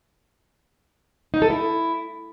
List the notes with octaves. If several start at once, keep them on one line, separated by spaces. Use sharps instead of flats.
D#4
A4
E4